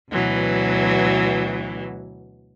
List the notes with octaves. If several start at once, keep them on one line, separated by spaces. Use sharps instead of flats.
D2 B2 E3 F#3